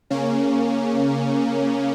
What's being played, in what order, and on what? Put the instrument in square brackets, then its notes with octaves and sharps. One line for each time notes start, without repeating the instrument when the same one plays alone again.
[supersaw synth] C#3 A#3 C#4